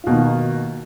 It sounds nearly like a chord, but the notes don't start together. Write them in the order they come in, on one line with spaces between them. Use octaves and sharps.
F4 B2 A#3 D#3